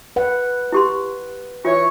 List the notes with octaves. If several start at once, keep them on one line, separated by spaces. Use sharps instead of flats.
B4 F#5
E4 G4 C6
E3 F4 C#5 C#6